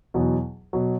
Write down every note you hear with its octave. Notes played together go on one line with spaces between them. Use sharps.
E2 B2 F#3
B2 F#3